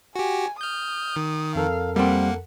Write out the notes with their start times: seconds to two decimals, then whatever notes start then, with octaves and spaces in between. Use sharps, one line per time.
0.16 F#4 G4 G#5
0.61 D#6 F6 G6
1.16 D#3
1.55 F2 A4 A#4 F5
1.96 G3 A#3 C4 F#5